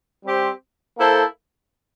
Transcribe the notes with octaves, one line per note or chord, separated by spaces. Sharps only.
G3 C4 G4 C5
A#3 E4 A4 C5